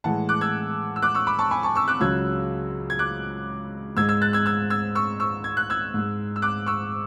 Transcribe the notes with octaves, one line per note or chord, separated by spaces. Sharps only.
A2 E3 G#3 F#5 A5
D6 F#6
E6 G#6
E6
D6 F#6
C#6 E6
B5 D6
A5 C#6
G#5 B5
A5 C#6
C#6 E6
D6 F#6
C#2 C#3 F#3 E6 G#6
G#6
D6 F#6
G#2 G#3 E6 G#6
E6 G#6
F#6 A6
E6 G#6
E6 G#6
E6 G#6
C#6 E6
C#6 E6
G#6
F#6
E6 G#6
G#2 G#3
E6
D6 F#6
C#6 E6